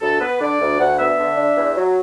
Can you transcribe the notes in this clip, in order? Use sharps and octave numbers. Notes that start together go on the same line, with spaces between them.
D2 A4
B3 B4
D3 D5
D2
D2 F#5
B3 E5
D3
D4
E2
F#3